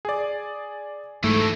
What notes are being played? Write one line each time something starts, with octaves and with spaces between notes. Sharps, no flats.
G#4 D5
G#2 E3 F#3 A3